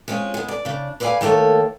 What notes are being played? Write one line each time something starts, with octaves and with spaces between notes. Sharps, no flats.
G#3 C4 C#4 F4
G#3 B3
D5
C#3 D4
B4 C5 D5 E5 F5 G#5
D#3 A3 A#3 A4 C#5